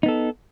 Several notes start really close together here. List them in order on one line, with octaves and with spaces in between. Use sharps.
D#4 B3 A4